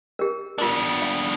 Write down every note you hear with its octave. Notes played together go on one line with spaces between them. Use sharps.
G4 A#4
B3 D4 F4 A#4
F5